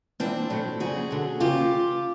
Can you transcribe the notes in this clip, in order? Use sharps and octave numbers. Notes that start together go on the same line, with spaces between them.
G#2 E3 C4 D4
A2 F#3
F2 C#3 F#3 F#4 G#4
D2 D3 F#3
F2 C#3 E3 F4 G4